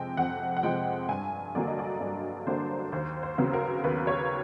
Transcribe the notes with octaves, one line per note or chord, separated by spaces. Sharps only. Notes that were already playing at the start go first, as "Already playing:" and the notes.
Already playing: F2 C3 F3 G#3 G5 G#5
F2 F#5
F#5
C3 F3 G#3 G5
G2 G#5
D3 F#3 A#3 D4 D5
D#5
D5
G2
D3 F#3 A#3 D4 C5
D#2 C5
C5
C#3 F#3 B3
A#4
D#2 B4
C#5